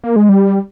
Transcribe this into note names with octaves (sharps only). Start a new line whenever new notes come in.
A#3
G#3
G3